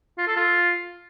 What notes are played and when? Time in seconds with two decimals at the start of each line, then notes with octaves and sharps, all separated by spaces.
0.18 F4
0.27 A4
0.36 F4